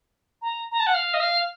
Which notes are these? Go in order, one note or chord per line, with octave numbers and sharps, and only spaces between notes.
A#5
A#5
A5
F#5
F5
D#5
F5